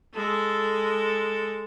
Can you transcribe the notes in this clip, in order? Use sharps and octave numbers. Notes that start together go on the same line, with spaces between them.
G#3 A4